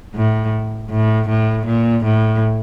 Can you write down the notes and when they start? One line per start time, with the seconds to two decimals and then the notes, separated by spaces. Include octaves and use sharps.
0.15 A2
0.90 A2
1.28 A2
1.67 A#2
2.05 A2